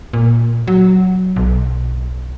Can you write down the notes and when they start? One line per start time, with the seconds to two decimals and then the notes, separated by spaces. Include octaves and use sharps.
0.13 A#2
0.68 F#3
1.36 B1